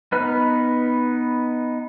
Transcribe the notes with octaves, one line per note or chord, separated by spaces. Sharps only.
B3 D#4 B4 F6